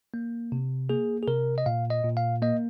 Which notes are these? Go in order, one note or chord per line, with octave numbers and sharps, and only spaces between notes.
A#3
C3
A#3 G#4
G#4
C3 A#4
D#5
A#2 F5
D#5
A#2
F5
A#3 D#5